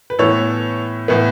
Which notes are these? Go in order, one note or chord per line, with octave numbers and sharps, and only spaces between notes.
B4
A2 E3 B3 A4 C#5
A2 E3 B3